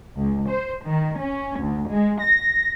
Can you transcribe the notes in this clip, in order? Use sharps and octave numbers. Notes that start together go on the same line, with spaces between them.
C#2
C5
D#3
C#4
D2
G#3
A#6